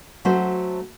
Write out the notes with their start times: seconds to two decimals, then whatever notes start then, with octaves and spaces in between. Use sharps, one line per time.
0.25 F#3 A3 C#4 F#4 C5